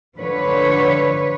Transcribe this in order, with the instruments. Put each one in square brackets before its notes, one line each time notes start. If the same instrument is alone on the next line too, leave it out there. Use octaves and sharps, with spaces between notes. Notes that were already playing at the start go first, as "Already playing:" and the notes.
[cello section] D3 F3 B4 C#5